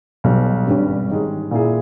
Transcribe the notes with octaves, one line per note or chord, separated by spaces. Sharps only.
B1 B2 G3
G#1 G2 G3 C#4
G#2 D#3 G#3
A#2 A#3 E4 G#4